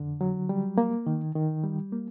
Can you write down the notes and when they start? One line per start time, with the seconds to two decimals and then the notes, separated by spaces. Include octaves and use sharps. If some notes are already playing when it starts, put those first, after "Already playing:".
Already playing: F2 D3
0.21 F#3
0.49 G3
0.78 A#3
1.06 D#3
1.35 D#3
1.64 G3
1.92 A#3